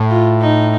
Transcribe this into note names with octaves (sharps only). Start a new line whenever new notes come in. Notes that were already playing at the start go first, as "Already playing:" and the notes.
Already playing: A2
F4
D#4